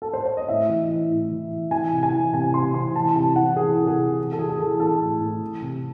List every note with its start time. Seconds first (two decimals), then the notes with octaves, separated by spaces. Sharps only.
0.02 A4
0.14 C5
0.26 C#5
0.37 D#5
0.48 A2 E5
0.69 E3
0.89 E3
1.11 A2
1.31 E3
1.52 E3
1.71 E3 G#5
1.93 C3
2.03 G#5
2.13 E3
2.33 C3 G#5
2.53 C3 C6
2.74 E3 C6
2.95 E3 A5
3.15 C3 A5
3.36 E3 F#5
3.57 E3 G#4
3.77 C3 A4
3.87 G#4
3.97 C3
4.18 E3
4.32 A4
4.39 E3 G#4
4.49 G#4
4.60 E3 A4
4.80 E3 A4
5.01 A2
5.21 A2
5.41 E3
5.62 C3